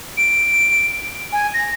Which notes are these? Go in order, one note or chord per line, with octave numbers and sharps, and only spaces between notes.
D7
G#5
A#6